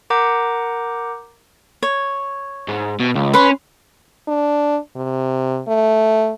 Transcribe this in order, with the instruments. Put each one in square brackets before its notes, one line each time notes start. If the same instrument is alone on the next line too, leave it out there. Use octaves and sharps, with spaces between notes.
[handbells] A#4 F#5 A#5 D6 G6
[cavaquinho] C#5
[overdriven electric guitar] G#2
B2
C#2
[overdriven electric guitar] C#4 [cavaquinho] B4 C6
[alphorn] D4
C3
A3